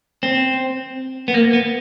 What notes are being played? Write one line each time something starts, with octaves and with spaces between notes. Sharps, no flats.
C4
B3
A#3
B3